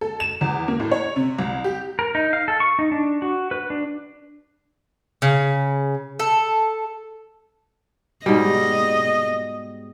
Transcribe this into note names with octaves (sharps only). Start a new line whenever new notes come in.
A4
E7
E2
A#3
A2
C#5
C3
C2
G4
A#4
D#4
F5
A4
C#6
D#4
D4
F#4
B4
D4
C#3
A4
G#2 B2 G3 D#5